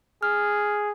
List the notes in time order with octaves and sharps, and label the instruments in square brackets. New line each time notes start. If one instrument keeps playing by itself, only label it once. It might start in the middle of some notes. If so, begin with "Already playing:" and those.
[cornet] G#4 [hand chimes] F6